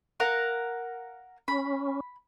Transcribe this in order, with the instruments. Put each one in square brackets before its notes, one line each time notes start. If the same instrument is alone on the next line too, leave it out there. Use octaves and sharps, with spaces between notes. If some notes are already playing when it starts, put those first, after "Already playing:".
[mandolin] A#4 F5 F#5
[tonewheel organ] C#4 [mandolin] B5